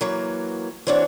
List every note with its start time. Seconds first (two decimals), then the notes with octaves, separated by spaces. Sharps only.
0.01 E3 F#3 A#3
0.87 E3 C4 D4 E4 F#4 C#5